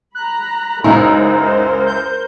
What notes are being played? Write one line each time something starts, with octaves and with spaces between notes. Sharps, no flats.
A#5 B5 F#6
C#2 F#2 D#4 E4 A#4 C5 A#5
G6